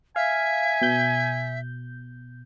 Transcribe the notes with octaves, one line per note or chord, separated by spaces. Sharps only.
E5 F5 G#5
B2 G6